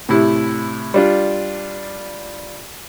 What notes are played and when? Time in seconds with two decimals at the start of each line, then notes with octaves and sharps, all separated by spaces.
0.09 A2 C3 E4
0.94 G3 D4 F4